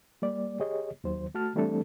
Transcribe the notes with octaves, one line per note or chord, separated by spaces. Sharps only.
G3 A#3 D5
G4 G#4 C#5 D#5
D#2 D#3 F#3 C5
A3 F#4 A5 F6
E3 G3 A3 C4 D4 A4